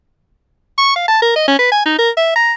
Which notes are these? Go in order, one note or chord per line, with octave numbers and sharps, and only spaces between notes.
C#6
F5
A5
A#4
D#5
C#4
B4
G#5
D#4
A#4
E5
A#5